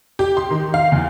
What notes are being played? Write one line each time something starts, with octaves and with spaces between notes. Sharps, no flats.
G4
C6
D#3
F5
E2